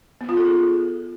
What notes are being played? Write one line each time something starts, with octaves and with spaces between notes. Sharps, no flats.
B3
F4
A4
G#4